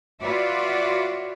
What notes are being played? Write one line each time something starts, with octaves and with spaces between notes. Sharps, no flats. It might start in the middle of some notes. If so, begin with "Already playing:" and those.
F4 F#4 B4 C#5 D5 E5